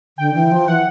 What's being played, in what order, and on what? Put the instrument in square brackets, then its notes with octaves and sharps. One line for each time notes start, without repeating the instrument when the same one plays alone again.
[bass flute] D3 [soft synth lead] G5
[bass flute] E3
F3
[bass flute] E3 [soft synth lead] F#5